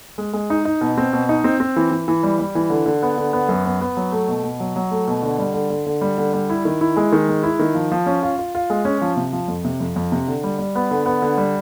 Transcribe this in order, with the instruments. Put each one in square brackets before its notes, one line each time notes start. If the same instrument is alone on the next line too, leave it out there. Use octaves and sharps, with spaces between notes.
[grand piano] G#3
G#3
D#4
D#4
B2
C4
B2
D#4
C4
C4
E3
E3
E3
G3
G3
E3
D3
D3
B3
D3
B3
F#2
B3
B3
F#3
A3
B2
B2
F#3
F#3
A3
B2
D3
G3
D3
D3
D3
G3
D3
G3
E4
D#3
E4
G#3
D#3
G#3
E4
D#3
F3
F3
C#4
F4
F4
F4
G#3
C#4
F3
C3
F3
F2
C3
F2
F2
C3
D3
G3
G3
B3
D3
B3
D3
G3